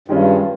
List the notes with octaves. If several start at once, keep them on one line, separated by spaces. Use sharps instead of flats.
G2 D#3 G#3 C#4 F4